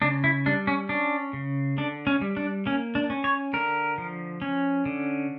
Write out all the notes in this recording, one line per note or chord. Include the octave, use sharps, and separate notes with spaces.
C#3 D4
E4
G3 D4
C#4
C#4 D4
C#3
D3 D4
C#4
G3
D4
A#3 C#4
D4
C#4
C#5
D3 A#4
F3
C#4
D3